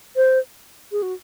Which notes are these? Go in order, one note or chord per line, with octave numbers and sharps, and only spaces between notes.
C5
G#4
F#4